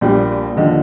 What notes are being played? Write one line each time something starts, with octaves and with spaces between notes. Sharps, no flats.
A#1 A#2 G3
D#2 D3 F3 D#5